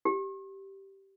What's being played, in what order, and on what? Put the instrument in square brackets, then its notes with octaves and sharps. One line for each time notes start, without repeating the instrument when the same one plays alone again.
[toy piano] G4